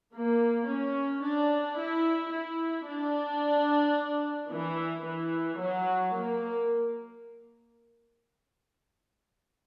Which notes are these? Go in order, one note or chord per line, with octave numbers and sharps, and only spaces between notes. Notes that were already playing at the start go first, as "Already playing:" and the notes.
A#3
C#4
D4
E4
E4
D4
E3
E3
F#3
A#3